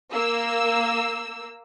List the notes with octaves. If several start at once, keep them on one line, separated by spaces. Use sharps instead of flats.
A#3 E6